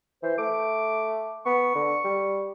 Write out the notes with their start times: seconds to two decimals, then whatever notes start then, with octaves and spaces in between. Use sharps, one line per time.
0.23 E3 C5
0.38 A3 D6
1.46 B3 C#6
1.75 D3
2.04 G3